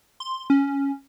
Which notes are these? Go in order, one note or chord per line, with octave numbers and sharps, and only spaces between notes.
C6
C#4